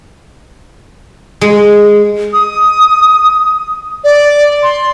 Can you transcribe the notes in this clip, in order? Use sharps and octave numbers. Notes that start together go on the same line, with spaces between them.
G#3
D#6
D5
C6